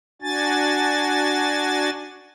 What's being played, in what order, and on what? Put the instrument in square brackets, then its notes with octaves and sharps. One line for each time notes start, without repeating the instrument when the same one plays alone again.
[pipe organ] D4 F#4 G#5 A6